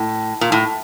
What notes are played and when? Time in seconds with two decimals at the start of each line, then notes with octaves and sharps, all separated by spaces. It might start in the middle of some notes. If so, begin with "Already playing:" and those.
Already playing: A2
0.41 A#2
0.52 A2